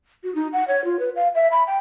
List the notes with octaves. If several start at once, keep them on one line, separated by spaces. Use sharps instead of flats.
F#4
D#4
F#5
C#5
F4
B4
F5
E5
B5
G5